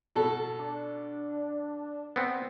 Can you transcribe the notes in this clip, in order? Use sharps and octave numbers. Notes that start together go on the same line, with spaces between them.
B2 A4
D4
B3 C4